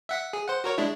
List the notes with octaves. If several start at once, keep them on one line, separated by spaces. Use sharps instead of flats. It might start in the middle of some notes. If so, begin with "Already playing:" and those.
E5 F#5 B6
G#4
C5 F#5
F#4 A#4 C#5
G#3 D4 E4